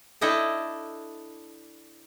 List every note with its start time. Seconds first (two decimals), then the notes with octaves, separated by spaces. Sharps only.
0.21 D4 E4 A4 D#5 G5 A5